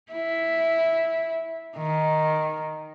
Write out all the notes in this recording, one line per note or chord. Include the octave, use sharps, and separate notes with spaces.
E4
D#3